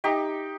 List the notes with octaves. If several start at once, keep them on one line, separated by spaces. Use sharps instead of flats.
D#4 G4